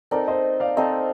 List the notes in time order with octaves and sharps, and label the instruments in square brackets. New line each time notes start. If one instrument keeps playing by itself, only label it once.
[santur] C4 D#4 A4 [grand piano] A#4 D5
[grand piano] C5 D#5
D5 F5
[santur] C4 D#4 A4 [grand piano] C5 D#5